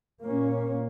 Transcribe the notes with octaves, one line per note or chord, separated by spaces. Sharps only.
A#2 A#3 C#4